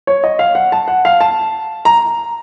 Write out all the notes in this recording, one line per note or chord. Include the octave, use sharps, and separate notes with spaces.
C#5
D#5
F5
F#5
A5
F#5
F5
A5
A#5